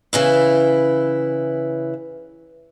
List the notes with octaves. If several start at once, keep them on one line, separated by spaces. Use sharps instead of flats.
C#3 E3 E4